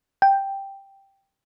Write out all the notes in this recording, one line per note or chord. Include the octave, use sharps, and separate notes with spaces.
G5